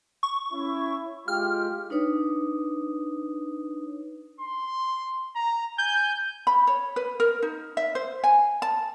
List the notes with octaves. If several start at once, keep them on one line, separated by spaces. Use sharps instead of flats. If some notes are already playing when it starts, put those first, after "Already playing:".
C#6
C#4 E4
G#3 F4 G4 F6
D4 D#4 B4 C#5 D#6
C6
A#5
G#5 G6
B5
C#5
B4
A#4
D#4
E5
C5
G#5
A5